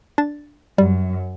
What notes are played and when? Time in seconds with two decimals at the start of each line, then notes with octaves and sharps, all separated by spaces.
0.18 D4 A6
0.78 F#2 G3